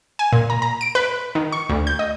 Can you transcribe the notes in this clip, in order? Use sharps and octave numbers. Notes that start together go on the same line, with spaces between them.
G#5
A#2
A#5
A#5
D7
B4
D#3
C#6
D2
G6
D#5